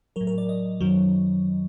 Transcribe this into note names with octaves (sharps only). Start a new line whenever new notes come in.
A2 F#3 A#4
A#4
D5
D#5
F#2 D#3 F#3